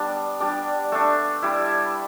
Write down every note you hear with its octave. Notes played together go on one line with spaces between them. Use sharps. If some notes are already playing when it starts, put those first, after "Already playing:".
Already playing: G3 B3 D4
G3 D4 D6
A3 D4
G3 E4